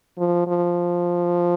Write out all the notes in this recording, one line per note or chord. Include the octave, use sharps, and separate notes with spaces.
F3
F3